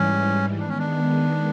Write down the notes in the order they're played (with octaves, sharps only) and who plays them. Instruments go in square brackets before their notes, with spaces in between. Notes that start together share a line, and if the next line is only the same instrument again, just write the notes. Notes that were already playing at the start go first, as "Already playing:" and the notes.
Already playing: [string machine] G#2 E3 G3 [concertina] C#4
[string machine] D#3 G#3 B3 [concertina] D4
[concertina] C#4
D4